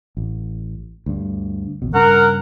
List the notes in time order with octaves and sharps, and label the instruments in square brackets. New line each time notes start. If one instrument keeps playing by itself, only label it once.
[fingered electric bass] A1
D2 G2
A1 D#2 B2
[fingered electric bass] G2 C#3 [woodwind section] A#4 F#5